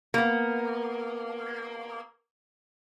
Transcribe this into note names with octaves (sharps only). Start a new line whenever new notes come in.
A#3 B3